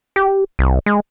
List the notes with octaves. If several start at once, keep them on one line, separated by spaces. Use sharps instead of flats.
G4
C2
G#3